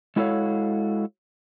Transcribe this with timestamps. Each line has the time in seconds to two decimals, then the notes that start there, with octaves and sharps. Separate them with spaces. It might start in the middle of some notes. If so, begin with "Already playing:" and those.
0.16 G#3 E4 F#4 A4 C#5 F5